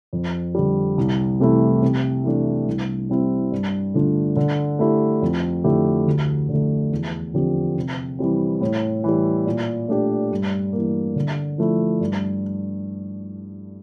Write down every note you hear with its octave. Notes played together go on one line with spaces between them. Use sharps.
F2
D3 G3
C2
C3 E3 A3 E4
C3
E3 A3 D4
C2
C3 G3 C4 E4
G2
D3 A3 D4 F4
D3
A3 E4 G4
F2
D3 A3 E4 G4
D2
D3 A3
E2
D3 F3 C4 G4
C3
E3 G3 C4
A2
E3 G3
A#2
A3 D4 G4
G2
E3 A#3
D3
F3 A3 E4
G2